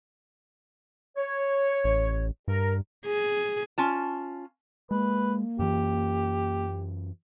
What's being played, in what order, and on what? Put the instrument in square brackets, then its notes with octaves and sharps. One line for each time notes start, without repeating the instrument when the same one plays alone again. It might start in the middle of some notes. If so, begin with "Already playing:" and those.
[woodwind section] C#5
[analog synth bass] A1
[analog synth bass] G2 [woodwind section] A#4
[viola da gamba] G#4
[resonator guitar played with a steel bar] C#4 F4 A5
[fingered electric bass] G#3 [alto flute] A#3 [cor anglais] B4
[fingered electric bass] F#2 E3 [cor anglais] G4